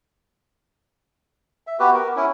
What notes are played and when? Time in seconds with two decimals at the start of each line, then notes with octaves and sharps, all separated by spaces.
1.67 E5
1.80 B3 F#4 G4 B4
1.94 A#4
2.16 C#4 E4